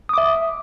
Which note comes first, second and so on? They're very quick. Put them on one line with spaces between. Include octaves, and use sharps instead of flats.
D#6 D6 E5